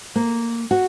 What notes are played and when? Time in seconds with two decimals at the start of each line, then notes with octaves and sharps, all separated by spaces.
0.16 A#3
0.71 F#4